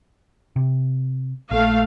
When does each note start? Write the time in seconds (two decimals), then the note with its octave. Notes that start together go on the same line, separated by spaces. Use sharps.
0.56 C3
1.51 A#1 A3 F5